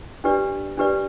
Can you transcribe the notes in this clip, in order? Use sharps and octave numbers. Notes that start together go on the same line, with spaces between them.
D4 G4 B4 D5
D4 G4 B4 D5